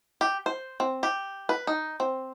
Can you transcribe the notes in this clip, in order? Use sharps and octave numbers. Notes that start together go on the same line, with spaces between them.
G4
C5
C4
G4
B4
D#4
C4